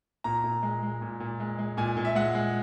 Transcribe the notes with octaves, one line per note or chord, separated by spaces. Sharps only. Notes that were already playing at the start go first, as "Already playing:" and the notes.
A#2 A#5
A#2
G#3
G#3
A#2
A#2
G#3
G#3
A#2 G#5
A#2
E5
G#3 F#5
G#3